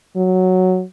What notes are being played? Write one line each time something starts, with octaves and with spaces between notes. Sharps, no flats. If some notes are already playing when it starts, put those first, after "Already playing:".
F#3